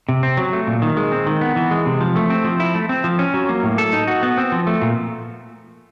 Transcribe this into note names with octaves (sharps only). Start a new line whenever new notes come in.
C3
C4
F#3
A3
A#2
D#3
G#3
C4
D#3
B3
E3
G#3
C3
F3
A3
C4
F3
E4
A3
C4
F3
C#4
F#3
A#3
A2
A4
D#4
F#4
B3
C4
F3
A3
A#2